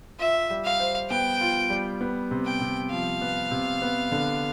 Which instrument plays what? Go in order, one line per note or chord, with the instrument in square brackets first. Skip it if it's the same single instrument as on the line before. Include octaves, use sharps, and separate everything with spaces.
[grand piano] F4 [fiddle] E5
[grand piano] G3
[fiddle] F5
[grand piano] C5
[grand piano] B3 [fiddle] G5
[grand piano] F4
G3
B3
C3
[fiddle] G5
[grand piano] C3
[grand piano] F3 [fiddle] F5
[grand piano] B3
C3
B3
D3